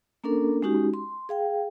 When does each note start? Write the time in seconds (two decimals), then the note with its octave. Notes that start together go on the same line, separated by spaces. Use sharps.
0.24 A#3 C#4 D4 A4 A#4
0.62 G#3 C#4 D#4 F#4 G4
0.94 C6
1.29 G#4 F5 G5